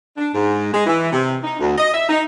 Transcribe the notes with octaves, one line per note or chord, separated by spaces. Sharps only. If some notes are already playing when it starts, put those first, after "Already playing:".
D4
G#2
G#3
E3
C3
D#4
D2
D#5
E5
D#4